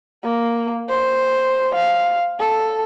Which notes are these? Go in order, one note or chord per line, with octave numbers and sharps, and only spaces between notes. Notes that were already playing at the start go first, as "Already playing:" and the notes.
A#3
C5
F5
A4